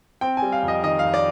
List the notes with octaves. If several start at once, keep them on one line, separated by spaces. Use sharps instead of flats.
C4 G5
G#5
G3
F5
F2
D#5
D#3 D#5
F2 F5
D5